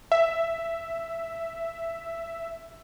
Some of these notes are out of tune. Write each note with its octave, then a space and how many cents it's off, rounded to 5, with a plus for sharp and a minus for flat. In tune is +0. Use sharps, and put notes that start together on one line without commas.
E5 +10